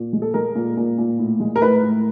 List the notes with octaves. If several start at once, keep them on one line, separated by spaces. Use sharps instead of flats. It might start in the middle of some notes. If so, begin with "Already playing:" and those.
Already playing: A#2
G#3
A4
G#3 A#4
A#2
A#2
A#2
A2
G#3
A#4
A2 B4
A2